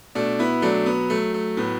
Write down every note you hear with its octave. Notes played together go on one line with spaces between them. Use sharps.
B2 A3 D4
B3 E4
F#3 A3 D4
B3
F#3 A3
A3
A2 B3